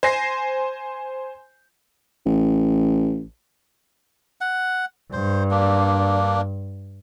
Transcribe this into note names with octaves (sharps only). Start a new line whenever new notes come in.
C5 G#5 A#6 C7
A1
F#5
G2 C5
A#3 D4